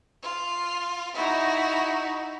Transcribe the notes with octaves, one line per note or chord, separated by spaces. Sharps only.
F4
D#4 E4 F#4